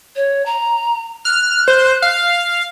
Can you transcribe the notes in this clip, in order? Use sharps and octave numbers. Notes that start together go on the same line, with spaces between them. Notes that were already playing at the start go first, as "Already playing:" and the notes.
C#5
A#5
F6 F#6
C5
F5